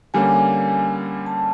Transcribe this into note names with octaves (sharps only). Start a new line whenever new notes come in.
D3 G3 A#3 C#4 G#5
A5